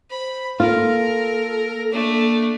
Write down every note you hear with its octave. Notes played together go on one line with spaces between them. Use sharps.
C5 B5
A#3 F4 A4 A#4
A3 A#3 D4